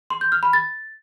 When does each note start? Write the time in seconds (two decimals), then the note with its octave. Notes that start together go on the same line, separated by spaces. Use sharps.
0.10 C6
0.21 G6
0.32 F6
0.43 B5
0.53 A6